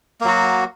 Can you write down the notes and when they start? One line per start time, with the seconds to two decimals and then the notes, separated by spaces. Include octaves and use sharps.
0.21 A#3
0.24 F#3
0.28 F#4